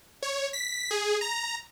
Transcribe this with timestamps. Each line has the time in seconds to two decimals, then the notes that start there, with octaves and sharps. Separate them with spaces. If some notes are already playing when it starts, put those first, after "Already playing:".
0.23 C#5
0.53 B6
0.91 G#4
1.21 A#5